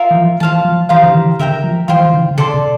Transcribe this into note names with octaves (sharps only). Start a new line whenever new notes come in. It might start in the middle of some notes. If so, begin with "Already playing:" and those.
Already playing: F4 A#4 E5
E3
F3
E3 C5 F5 A5
F3
E3 G4 C5 F5 A#5
D3
E3
D3 A#4 E5 G5 A#5
F3
E3 F4 C5 G5 C6
E3
D3
D3
C3 A4 D5 A5 C6
C3